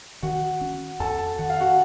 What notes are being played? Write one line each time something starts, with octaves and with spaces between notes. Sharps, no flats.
D#3 F#4 F#5
C#4
F2 A4 A5
D#3 F#5
F5
F#4 F#5